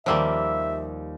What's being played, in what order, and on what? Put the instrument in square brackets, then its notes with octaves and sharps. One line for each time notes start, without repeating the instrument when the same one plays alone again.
[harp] D#2 E6 D7 [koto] F3 G3 A#3 [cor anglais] E5